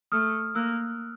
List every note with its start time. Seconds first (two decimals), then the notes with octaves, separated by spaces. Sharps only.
0.12 A3 D#6 F6
0.55 A#3 E6 F#6